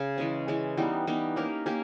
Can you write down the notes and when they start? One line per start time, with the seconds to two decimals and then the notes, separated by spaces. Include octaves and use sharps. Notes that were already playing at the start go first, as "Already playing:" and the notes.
Already playing: C#3
0.18 E3 G#3 C#4
0.48 E3 G#3 C#4
0.77 E3 G3 B3 D#4
1.07 E3 G3 B3 D#4
1.36 A#3 C#4 G4 A#4
1.66 A#3 C#4 G4 A#4